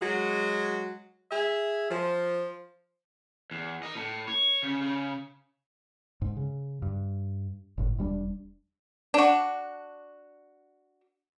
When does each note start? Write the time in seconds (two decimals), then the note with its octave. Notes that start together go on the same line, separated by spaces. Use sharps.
0.02 F#3 G#3 F#4
1.31 G#4 E5
1.91 F3
3.51 E2
3.83 A#4 D#5
3.96 A2
4.28 C#5
4.63 C#3
4.82 C#3
6.22 G#2
6.37 C#3
6.82 G2
7.78 G1 A2
7.98 E1 G3 C#4 D4
9.14 D4 F#4